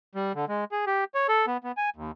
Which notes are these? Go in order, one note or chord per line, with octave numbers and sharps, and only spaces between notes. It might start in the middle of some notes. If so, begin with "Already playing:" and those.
G3
D3
G#3
G#4
G4
C#5
A4
B3
B3
G#5
D#2